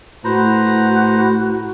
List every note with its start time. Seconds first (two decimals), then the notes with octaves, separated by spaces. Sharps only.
0.24 A2 F#4 B4 C5 A#5